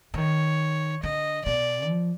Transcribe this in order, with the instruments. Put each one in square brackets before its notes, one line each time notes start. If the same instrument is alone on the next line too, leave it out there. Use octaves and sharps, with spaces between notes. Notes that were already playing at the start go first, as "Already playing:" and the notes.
[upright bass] D3
[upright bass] D#3 [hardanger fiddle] C#5
[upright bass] D3 [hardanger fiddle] D#5
[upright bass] B2 [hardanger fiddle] D5
[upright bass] F3